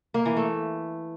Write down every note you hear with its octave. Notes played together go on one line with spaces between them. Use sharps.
A#3
E3
A3